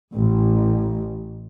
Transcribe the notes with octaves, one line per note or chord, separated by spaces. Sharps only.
A1